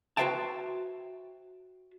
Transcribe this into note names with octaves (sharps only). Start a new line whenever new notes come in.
F#4 B4 C5 E5 G5 A5